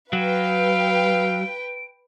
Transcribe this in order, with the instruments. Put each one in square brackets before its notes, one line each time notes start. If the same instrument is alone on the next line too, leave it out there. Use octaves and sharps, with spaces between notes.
[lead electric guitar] F#3 [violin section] B4 G5 [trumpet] F5 [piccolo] D7